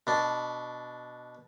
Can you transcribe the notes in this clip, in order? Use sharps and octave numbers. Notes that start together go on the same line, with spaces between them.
B2 D4